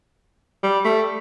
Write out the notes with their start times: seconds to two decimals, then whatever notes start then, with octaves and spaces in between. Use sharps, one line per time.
0.63 G3
0.85 A3